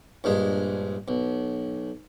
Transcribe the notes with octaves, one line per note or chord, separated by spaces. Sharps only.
A#1 G2 G#3
B1